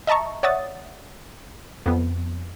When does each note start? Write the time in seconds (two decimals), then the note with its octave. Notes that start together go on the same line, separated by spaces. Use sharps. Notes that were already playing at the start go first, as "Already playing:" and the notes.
0.07 D#5 E5 A5 A#5 C#6
0.43 C#5 D5 E5 F#5 D#6 A6
1.86 F2 B3